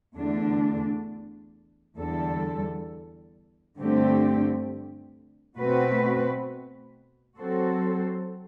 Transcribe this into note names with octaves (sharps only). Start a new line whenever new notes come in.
E2 D3 A3 D4
E2 D3 G3 D4 A4
G2 D3 A3 C4 G4
B2 A3 C4 F#4 B4
F#3 C4 F#4 A4 C5